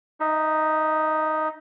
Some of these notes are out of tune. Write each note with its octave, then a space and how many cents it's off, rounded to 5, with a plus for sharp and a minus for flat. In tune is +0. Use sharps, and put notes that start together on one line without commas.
D#4 +0 E5 -30